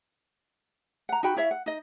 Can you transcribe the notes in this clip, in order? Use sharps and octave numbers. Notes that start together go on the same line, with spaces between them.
F#5 A#5
D#4 F#4 G5 B5
E4 C#5 E5 F5
F#5
D#4 D#5